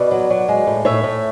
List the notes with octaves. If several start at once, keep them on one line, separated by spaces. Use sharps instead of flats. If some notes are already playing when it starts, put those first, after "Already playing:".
Already playing: B2 B4 D5
F#3
F#3
G#3
A2
A2 C#5 E5
A2